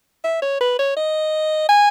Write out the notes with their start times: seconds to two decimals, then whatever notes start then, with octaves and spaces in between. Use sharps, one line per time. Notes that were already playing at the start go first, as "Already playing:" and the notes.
0.24 E5
0.42 C#5
0.61 B4
0.79 C#5
0.96 D#5
1.69 G#5